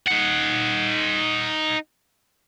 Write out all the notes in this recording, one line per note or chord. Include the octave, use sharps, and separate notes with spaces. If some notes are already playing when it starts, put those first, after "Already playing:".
D#4 F#5